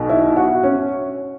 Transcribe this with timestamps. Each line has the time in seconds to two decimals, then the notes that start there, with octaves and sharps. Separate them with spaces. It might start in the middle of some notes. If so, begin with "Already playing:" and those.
Already playing: B1 B2
0.09 E4
0.36 F#4
0.63 C#4